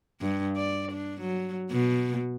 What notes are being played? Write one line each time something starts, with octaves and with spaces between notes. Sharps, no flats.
G2
D5
D4
F#3
B2